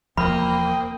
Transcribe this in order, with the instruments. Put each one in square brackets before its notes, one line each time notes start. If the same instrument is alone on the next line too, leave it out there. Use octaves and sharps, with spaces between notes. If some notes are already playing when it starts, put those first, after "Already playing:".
[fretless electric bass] E1 E2 F3 [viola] A#3 [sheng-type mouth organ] C4 G5 D#6 [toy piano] B5